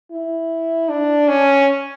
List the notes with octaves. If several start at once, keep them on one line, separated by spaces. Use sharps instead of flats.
E4
D4
C#4